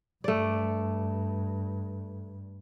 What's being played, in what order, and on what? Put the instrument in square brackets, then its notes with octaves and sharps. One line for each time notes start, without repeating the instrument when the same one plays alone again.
[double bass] G2 [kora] A3 D5